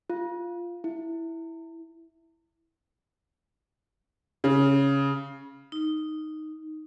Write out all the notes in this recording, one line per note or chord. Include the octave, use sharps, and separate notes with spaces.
F4
E4
C#3
D#4